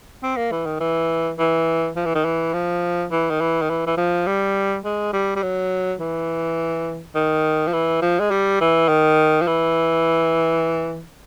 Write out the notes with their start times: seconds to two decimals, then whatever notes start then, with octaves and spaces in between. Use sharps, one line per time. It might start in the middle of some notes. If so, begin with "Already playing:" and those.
0.23 C4
0.36 A#3
0.51 E3
0.66 D#3
0.80 E3
1.39 E3
1.96 F3
2.05 E3
2.15 D#3
2.25 E3
2.53 F3
3.11 E3
3.30 D#3
3.41 E3
3.62 D#3
3.70 E3
3.87 E3
3.97 F3
4.27 G3
4.85 G#3
5.13 G3
5.35 G3
5.42 F#3
5.99 E3
7.15 D#3
7.67 F3
7.73 E3
8.02 F3
8.20 G#3
8.31 G3
8.61 E3
8.88 D#3
9.41 F3
9.47 E3